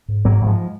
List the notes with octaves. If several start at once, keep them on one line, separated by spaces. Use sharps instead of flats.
G#2
G#2 F#3 A#3
G#2
F3 G#3